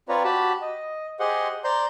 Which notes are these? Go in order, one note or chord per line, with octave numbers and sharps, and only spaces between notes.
C4 F4 B4 C#5 D5 A#5
F#4 G4 A5 B5
D#5
G4 G#4 C5 D#5 F#5 C6
C5 D5 A#5 C6 G6